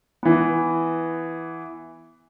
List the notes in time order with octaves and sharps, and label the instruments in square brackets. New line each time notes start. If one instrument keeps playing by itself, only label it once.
[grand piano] E3 B3